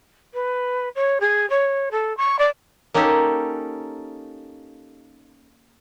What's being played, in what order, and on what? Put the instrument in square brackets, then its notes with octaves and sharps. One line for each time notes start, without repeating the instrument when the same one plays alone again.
[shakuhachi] B4
C#5
G#4
C#5
A4
C#6
D5
[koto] A#3 C#4 D#4 G4 A4